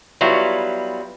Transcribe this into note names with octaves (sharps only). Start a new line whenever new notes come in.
F#3 G3 B3 E4 F4